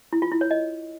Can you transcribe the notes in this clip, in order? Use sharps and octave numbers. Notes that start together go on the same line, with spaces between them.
E4
F4
E4
C#5
D#5